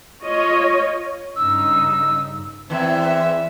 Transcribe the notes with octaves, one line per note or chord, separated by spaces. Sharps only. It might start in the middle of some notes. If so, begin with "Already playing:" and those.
F4 C#5 D#5
G2 C#3 D#4 E6
E2 E3 C4 E5